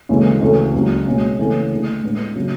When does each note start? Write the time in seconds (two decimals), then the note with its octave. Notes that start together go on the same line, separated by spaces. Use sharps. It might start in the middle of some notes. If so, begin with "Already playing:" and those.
0.09 D2 C#3 E3 G#3
0.41 D2 C#3 E3 A3
0.74 C#2 C#3 F#3
1.07 B2 G#3 C#4
1.38 C#3 E3 A3 C#4 E4
1.70 D3 A3 D4 G#4
2.03 A2 G#3 B3 D4
2.36 C#3 F#3